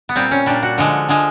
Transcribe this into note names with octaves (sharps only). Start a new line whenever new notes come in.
B3
A#2 G3 C4
C#4
A#2 G3 D4
F#4
D3 F3 G#3
D3 F3 G#3 G#4